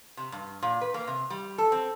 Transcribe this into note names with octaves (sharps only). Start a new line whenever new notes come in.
C3
G2
A#2
B4
A#3
C3
G3
A4
C4